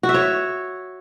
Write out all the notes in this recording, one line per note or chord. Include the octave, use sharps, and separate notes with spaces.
F#4
E5
C#5